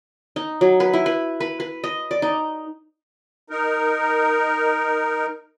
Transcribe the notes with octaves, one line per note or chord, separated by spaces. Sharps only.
D#4
F#3
B4
E4
B4
B4
B4
D#5
D5
D#4
D#4 A#4